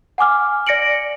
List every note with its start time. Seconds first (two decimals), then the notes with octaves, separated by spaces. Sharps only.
0.18 F#5 G#5 D6 F6
0.67 D5 A#6 C#7 D7 F#7